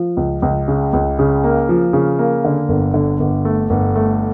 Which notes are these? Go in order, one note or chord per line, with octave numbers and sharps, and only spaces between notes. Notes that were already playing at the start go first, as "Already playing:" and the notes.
Already playing: F3
C#2
C#2
C#3
C#2
C#3
A#3
F3
C#3
A#3
D3
G1
D3
G1
A3
G1
A3